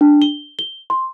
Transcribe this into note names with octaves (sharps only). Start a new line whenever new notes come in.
D4
G7
G7
C6